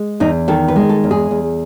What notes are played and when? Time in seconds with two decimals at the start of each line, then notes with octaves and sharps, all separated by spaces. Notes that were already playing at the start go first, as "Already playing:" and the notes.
Already playing: G#3
0.20 E2 D#4
0.48 D#3 A4
0.68 B4
0.76 G#3
0.89 A4
1.04 E2
1.11 G#4
1.31 E2